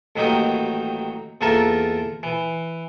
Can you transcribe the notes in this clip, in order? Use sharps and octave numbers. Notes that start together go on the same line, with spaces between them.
A1 D#3 F#3 A#3 D#4 G4
E2 A#3 F4 A4 A#4 E5
E3